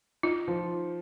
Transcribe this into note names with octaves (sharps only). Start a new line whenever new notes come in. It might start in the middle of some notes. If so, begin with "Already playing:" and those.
D#4 F4
F3